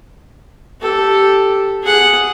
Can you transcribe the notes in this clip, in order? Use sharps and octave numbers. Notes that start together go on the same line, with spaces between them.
G4 A4
G#4 F#5